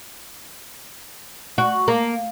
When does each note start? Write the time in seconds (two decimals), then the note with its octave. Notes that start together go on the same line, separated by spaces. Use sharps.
1.58 F#4
1.88 A#3